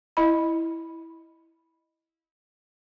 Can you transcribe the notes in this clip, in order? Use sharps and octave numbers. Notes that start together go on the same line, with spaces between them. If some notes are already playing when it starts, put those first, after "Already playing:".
E4 D#5 B5